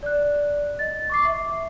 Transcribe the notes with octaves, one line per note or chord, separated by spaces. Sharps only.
D5 F#6
D#5 A6
C#6 D6 C7
E5